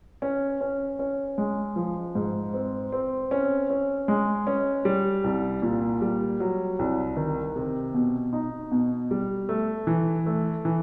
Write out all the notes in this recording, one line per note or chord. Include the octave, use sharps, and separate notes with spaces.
C#4
C#4
C#4
G#3
F3
G#2
C4
C4
C#4
C#4
G#3
C#4
G3
C2
A#2
G3
F#3
C2
D#3
C3
B2
D#4
B2
G3
A3
E3
A3
E3